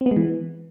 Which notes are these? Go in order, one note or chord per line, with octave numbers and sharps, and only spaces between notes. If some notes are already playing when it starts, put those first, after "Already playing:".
C4
B3
G#3
E3